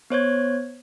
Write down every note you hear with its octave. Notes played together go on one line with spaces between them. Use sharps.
B3 C5 C#5 G#6